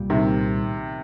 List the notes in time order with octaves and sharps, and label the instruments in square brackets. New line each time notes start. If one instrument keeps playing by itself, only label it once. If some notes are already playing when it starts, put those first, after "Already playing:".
Already playing: [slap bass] C2 A#2 G3
[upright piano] C3 D#3